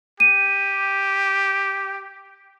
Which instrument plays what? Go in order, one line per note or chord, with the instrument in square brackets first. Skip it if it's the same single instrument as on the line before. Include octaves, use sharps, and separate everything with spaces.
[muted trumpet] G4 [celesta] D#7